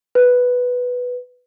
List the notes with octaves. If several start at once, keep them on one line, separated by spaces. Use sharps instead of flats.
B4